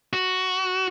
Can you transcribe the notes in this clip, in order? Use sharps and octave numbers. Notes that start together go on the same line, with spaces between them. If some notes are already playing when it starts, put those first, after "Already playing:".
F#4